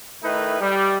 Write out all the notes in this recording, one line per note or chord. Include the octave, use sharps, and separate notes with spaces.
D#3 A3 D#4 E4 B4
G3